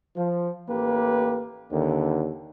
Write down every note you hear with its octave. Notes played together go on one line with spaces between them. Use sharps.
F3
A1 A#3 G4 B4
D#2 D3